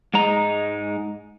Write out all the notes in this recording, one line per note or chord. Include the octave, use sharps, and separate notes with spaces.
G#2 G#3 D#4 A#5